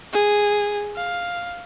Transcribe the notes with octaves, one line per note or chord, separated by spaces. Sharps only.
G#4
F5